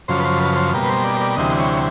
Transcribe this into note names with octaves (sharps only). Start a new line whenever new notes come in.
F#2 C#3 F3 C5
B4
C5
B4
C5
B2 G3 A#3
B4
C5
D5
D5
D2 C3 E3 G3 D#5
C#5
C#5